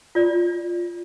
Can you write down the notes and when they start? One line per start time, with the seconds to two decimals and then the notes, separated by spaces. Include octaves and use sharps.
0.15 F4 D5